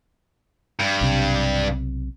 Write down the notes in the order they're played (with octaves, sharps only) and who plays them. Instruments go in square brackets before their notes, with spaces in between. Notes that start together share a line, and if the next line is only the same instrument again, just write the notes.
[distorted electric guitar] G2
[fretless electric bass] B1 C3